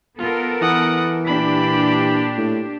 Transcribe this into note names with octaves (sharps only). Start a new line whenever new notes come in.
B3 F4 A4 A#4
E3 F#5 D#6
A#2 D4 G4 B5
A2